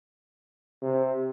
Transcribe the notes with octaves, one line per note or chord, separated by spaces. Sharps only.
C3